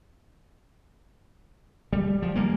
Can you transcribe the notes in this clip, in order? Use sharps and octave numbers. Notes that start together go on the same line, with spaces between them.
G3
F3
G3 G#3 A#3